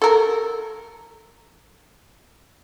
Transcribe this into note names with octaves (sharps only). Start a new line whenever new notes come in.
A4 A#4